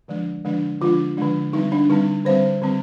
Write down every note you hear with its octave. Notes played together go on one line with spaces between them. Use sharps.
D3 F3 G#3 D4
D3 F3 G#3 D4
D3 F3 G#3 D4 F4
D3 F3 G#3 D4
D3 G3 C4 D#4
D4
D3 G3 C4 D#4
D3 G3 C4 C5
D3 G3 C4